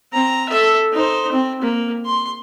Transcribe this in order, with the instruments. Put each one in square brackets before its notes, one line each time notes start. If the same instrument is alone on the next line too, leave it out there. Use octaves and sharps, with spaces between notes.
[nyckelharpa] C4 A#5
A4 E5
D#4 C5
C4
A#3
C6